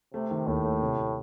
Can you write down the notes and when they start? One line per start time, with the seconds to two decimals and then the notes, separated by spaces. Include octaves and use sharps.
0.14 C3 A3
0.31 D#3
0.47 D#2 A2
0.64 A3
0.82 C3
0.97 C3